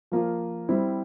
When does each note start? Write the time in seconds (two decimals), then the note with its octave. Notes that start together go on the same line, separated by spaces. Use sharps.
0.12 F3 A#3 F4
0.69 G3 C4 E4